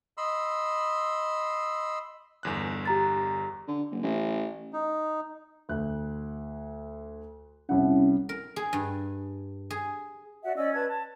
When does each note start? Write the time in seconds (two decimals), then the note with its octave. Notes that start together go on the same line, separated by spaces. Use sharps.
0.17 D#5 B5 C6 E6
2.43 G1 E2 F#6
2.86 G4 A#5 A6
3.68 D3
3.91 F#1
4.03 A1
4.73 D#4
5.69 D2 F#6
7.69 C2 C#4 E4 F#5
8.29 A#4
8.56 G#4
8.73 G2
9.70 G#4
10.43 F#4 D5 E5 F#5
10.56 C#4 D5 D#5 E6
10.74 B4 A5 G#6
10.88 A5